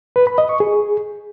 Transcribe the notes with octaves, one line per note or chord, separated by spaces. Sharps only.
B4
B5
D#5
C#6
G#4